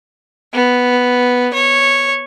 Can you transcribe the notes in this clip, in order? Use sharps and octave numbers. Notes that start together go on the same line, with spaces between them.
B3
C#5